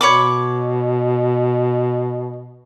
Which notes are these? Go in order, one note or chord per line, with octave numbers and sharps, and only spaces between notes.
B2 C#5 B5 D6